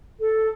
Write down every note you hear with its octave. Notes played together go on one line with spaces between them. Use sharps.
A4